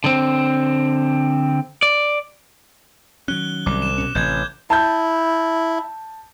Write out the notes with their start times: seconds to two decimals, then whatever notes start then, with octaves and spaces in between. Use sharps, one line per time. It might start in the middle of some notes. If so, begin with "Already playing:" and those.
0.04 D3 C4
1.83 D5
3.28 D#3 F#3 C#4 F#6 G7
3.66 C2 D6
3.82 E7
3.98 B2 C#4
4.15 A1 C3 G6 G#6
4.70 E4 A5 G6